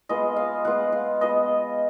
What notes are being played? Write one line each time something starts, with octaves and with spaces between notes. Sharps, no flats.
G#3 B3 F4 D#5
F5
G#3 B3 F4 F#5
F5
G#3 B3 F4 D#5